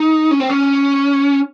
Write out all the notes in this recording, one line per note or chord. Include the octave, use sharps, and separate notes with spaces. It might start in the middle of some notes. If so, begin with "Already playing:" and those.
Already playing: D#4
C#4
C4
C#4